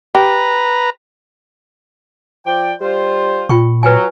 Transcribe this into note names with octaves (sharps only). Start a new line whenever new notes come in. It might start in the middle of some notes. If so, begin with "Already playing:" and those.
G4 B4 A#5
F3 D5 G5
G3 F4 C5
A#2 F4 G5 C#6
F#3 B4 G5 G#5